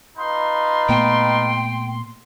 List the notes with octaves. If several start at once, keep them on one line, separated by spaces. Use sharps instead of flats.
D#4 F4 B4 C6
A#2 A3 B3 G5